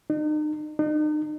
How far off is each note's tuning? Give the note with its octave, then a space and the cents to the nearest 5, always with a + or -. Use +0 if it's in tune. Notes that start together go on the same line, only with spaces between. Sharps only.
D#4 -40
D#4 -40